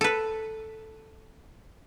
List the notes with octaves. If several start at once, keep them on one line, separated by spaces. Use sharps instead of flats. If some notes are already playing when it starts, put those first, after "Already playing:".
A4 B4